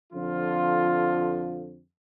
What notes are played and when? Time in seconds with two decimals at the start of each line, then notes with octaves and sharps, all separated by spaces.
0.13 F2 D3 F3 F4